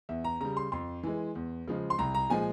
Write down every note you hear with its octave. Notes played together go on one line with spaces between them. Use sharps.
E2 E5
A#5
C#3 G3 A#5
C6
F2 C6
E3 G#3
E2
C#3 F3 G#3
C6
C2 A#5
A#5
A#2 F3 G#3 G#5